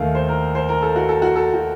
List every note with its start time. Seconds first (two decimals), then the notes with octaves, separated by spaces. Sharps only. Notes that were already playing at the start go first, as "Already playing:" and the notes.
Already playing: D#2 D#3 A3 F5
0.15 C5
0.29 A#4
0.55 C5
0.69 A#4
0.82 A4
0.96 F#4
1.09 A4
1.22 F#4
1.36 A4
1.54 F#4